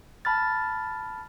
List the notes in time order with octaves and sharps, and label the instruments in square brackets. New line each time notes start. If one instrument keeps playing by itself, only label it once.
[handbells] A5 B5 F6 A6